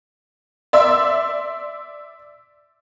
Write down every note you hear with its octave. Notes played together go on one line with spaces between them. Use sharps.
D5 E5 C6 E6